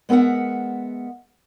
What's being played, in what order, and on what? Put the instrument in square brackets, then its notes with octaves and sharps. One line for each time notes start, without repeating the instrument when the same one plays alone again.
[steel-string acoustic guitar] G#3 B3 A#4 E5 F#5